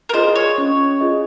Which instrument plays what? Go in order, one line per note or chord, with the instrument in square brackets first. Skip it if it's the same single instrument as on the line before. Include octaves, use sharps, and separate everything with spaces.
[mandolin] A#4
[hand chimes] F4 G#4 D#5 [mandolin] C5
[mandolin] C#5
[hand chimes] C#4
F4 G#4 D#5